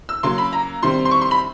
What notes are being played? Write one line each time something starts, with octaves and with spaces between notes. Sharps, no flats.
E6
C#3 F#3 A#3 C6
B5
A#5
C3 D#3 G3 C4 C6
C6
C#6
C6
B5